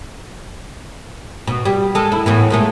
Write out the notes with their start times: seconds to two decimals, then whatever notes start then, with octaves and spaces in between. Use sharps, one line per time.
1.47 B2
1.65 G3
1.95 G#3 A4
2.12 E4
2.26 A2 E3 B3
2.50 A#2 G#3 A3